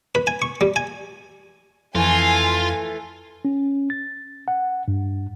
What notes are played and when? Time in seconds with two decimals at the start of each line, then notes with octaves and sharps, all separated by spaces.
0.15 B4
0.27 G#5
0.42 C#6
0.61 G3
0.76 G#5
1.95 F2 E3 A3 F4 G#5
3.45 C#4
3.90 A6
4.48 F#5
4.88 G2